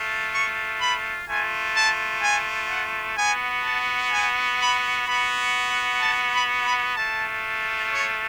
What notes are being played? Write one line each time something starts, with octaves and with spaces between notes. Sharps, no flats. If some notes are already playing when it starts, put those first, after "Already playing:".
Already playing: A3 F4
C#6
B5
A3 G#5
F4
A5
G#5
F#5
B3 F#4 G#5
A5
G#5
B5
B3 F#4 B5
F#5
A5
B5
B5
A3 F4 A5
C#5